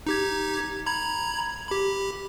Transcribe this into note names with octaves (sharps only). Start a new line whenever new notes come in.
D#4 G4 G#6
A#5 B5 G#6
G4 B5